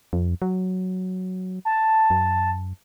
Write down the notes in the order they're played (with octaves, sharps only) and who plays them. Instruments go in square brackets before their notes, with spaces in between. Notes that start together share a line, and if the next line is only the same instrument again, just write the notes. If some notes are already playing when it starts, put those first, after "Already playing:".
[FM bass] F2
F#3
[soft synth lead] A5
[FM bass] F#2